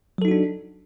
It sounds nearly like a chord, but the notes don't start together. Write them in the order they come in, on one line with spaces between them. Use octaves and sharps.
F#3 A4 D#4 F#4 D4